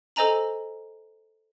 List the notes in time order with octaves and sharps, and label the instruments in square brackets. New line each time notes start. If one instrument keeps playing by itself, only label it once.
[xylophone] A4 C5 D#5 G#5 A#5 F#7